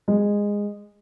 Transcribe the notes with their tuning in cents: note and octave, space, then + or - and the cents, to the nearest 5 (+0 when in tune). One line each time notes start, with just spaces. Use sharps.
G#3 -15